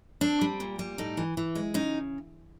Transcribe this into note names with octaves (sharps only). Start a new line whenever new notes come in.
C4 D4
G3
A#2
G3
A2 D#4
E3
E3
G#3
C#3 D#4